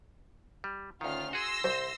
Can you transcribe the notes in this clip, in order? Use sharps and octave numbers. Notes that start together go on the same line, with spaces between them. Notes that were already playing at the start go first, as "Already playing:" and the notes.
G3
D2 D#3 C#4 F4 F6
F#4 G#4 C6 E6 A#6
C2 C5